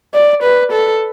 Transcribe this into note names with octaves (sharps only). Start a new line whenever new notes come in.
D5
B4
A4